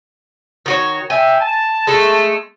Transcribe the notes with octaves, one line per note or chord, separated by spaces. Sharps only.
D#3 F#4 C#5
E5 G5 G#5
A5
G#3 A3